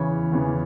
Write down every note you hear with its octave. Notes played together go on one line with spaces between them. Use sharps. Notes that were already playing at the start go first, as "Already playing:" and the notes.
Already playing: E2 C#3 E3 C#5
E2 C#3 E3